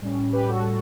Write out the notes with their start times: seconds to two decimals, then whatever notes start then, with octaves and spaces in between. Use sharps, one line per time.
0.01 A2 G3 C#4
0.33 G4 B4
0.49 F#4 A4